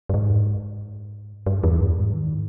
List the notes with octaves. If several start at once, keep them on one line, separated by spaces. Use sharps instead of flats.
G2
G#2
G2
E2
G2
G#2
D#3